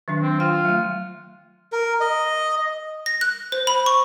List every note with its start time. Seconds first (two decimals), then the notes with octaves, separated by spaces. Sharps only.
0.08 D#3 F#3 D4
0.22 C4
0.40 F4 G5
0.65 F#3 A3
1.72 A#4
2.01 D#5
3.06 A#6
3.21 F#6
3.52 C5
3.67 B5
3.86 C#6